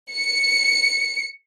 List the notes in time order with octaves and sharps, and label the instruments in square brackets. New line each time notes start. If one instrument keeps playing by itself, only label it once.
[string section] C#7